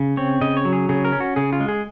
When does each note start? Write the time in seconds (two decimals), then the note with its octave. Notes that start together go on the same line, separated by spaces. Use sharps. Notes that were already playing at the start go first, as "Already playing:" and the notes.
Already playing: C#3
0.17 C4 C#5
0.41 C#3 D#5
0.57 C#5
0.65 F#3
0.73 G#4
0.89 C#3 G#4
1.04 A#4
1.12 C#4
1.20 F#4
1.36 C#3 G#4
1.53 F4
1.60 G#3
1.69 G#4